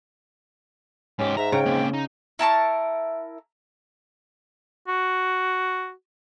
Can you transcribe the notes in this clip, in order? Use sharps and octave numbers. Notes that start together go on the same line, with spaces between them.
G#2 C#4 G4
G#2 E5 A#5
C#3 G5
A#3 C4
D#4
E4 A#4 A5 C#6
F#4